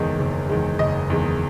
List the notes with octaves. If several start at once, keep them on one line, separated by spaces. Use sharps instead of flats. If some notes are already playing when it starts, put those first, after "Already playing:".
Already playing: F#1 E2 D#3 G#3
F#1
E2 D#3 G#3
F#1 D#5
E2 D#3 G#3